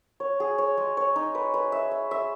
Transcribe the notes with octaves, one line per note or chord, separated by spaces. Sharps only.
C#5
G#4
C#5
G#3
C#5
D#4
B4
B4
E5
E5
E5